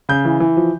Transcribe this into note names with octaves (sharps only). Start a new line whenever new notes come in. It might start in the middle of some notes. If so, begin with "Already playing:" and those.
C#3 G6
E3
E3
F3